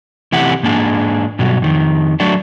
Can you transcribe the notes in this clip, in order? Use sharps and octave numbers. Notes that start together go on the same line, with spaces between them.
C3 E3 A3 E4 G4 F#5
G#2 A#3 D4 G4 G#4
G2 B2 F#3
F2 D#3
F#3 A3 D4 F#4